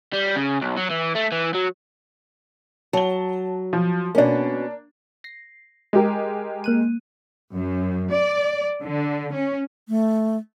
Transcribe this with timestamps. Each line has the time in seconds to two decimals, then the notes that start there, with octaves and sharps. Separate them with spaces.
0.13 G3
0.36 C#3
0.61 B1
0.77 F#3
0.90 E3
1.15 A3
1.32 E3
1.55 F#3
2.93 F#3 A5 G7
3.73 F3
4.15 B2 A#3 C#4 D4
5.24 A#6 C7
5.93 G#3 G4 A#4
6.64 A#3 F#6 D#7
7.54 F#2
8.10 D5
8.82 D3
9.33 C#4
9.88 A3